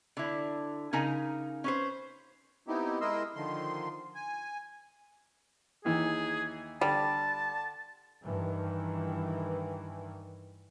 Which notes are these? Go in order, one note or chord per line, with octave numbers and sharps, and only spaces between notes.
D3 E4
C#3 D#4 A#4 G#5
C#4 B4 C5
B3 C4 D#4 E4 G4
G#3 E4 A#4 D#5 C6 E6
D3 D#3 F3 C6
G#5
D#2 E3 D#4 G#4
D3 G3 A5
G2 D#3 E3